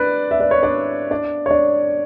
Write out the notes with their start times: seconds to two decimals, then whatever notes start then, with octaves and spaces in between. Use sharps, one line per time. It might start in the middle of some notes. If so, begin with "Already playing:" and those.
Already playing: D4 B4 D5
0.31 E5
0.41 D5
0.51 C#5
0.63 D4 D5
1.11 D4 D5
1.46 C#5
1.51 D4 D5